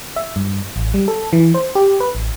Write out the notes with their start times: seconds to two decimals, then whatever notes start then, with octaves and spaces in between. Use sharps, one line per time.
0.16 E5
0.36 G2
0.76 A1
0.94 G3
1.08 A4
1.33 E3
1.54 C5
1.75 G4
2.00 B4
2.15 A1